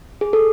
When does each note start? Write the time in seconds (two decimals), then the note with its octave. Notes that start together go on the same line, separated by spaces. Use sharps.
0.21 G#4
0.33 A4